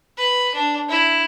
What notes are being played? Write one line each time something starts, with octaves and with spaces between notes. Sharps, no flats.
B4
D4
E4